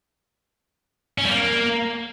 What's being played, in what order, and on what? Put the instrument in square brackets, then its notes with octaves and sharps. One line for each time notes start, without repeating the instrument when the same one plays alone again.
[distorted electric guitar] C#4
G3
A#3